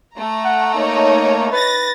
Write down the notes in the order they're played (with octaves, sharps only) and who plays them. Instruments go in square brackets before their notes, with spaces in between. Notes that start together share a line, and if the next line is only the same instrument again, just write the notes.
[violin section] A3 A#5
[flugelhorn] F#5
[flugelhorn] A#3 [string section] D#4 C#5
[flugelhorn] B4 [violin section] A6 A#6